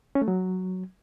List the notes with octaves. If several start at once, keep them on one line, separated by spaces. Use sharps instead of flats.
C#4
A3
F#3